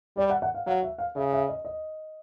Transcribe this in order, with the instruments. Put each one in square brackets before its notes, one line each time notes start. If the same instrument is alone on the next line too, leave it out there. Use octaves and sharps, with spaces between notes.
[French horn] G3 [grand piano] D5
[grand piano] F#5
F#5
F5
[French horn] F#3 [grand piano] F5
[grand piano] E5
F5
[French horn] C#3 [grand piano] E5
[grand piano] E5
D#5
D#5